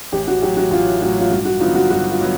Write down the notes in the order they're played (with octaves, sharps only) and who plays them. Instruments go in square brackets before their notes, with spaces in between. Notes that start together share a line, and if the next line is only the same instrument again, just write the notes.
[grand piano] A1 [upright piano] G4
[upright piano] F#4
[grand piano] A2 F#3 [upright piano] G4
[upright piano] F#4
[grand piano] A1 [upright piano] F4
[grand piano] A2 F#3 [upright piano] F#4
[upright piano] F4
[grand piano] G2 [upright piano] F#4
[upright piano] F#4
[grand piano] D3 F#3 B3 D#4 [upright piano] F4
[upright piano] F#4
[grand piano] G2 [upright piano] F#4
[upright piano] F4
[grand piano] D3 F#3 B3